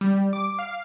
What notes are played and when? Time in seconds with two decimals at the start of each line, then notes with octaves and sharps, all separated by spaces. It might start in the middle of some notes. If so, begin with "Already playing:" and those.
0.01 G3
0.33 D6
0.59 F5